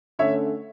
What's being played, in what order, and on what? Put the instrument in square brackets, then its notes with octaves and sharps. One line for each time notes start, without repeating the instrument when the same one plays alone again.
[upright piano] D3 A3 C#4 C#5 E5